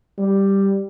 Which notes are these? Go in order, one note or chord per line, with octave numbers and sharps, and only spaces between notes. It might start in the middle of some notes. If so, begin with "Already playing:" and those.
G3